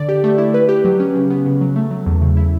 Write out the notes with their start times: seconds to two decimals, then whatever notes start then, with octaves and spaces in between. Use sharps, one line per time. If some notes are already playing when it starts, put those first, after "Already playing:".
Already playing: D3 D5
0.09 G4
0.24 A3
0.38 E4
0.54 B4
0.69 G4
0.85 F#3
1.00 C#4
1.15 C#3
1.30 B3
1.46 C#3
1.61 F#3
1.76 A3
1.91 F#3
2.06 E2
2.22 C#3
2.37 E4